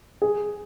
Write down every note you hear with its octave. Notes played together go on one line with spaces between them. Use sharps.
G#4